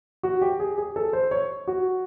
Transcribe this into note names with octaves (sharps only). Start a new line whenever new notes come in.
F#4
G4
G#4
G#4
A4
C5
C#5
F#4